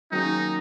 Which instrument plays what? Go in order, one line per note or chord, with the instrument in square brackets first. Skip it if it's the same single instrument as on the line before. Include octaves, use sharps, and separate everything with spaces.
[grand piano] D#3 F#3 A#3 C#4 G#4 [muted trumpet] D#4